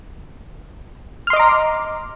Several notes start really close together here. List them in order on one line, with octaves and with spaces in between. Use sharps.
F6 C6 D#5 D6 A#5